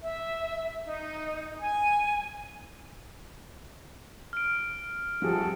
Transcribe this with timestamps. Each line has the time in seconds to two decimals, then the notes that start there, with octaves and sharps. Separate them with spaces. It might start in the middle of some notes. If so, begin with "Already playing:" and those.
0.02 E5
0.84 D#4
1.60 G#5
4.33 F6 D7
5.22 C3 F3 G3 F#4 G#4 A4